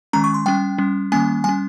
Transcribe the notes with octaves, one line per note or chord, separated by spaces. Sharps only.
D#3 G#3 C#4 A#5
C#6
C6
G3 C#4 G5
G3 C#4
D#3 G3 A#3 C#4 G#5
G3 C#4 G#5